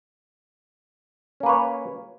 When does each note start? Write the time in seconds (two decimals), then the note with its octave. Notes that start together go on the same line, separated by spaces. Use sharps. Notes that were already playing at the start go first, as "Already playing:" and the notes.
1.40 C#4
1.43 A#3
1.46 B4
1.49 C#5